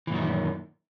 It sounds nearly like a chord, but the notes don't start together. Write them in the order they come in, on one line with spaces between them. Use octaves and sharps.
E3 A#2 F#2 D#3